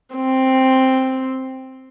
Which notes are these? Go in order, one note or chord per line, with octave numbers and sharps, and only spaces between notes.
C4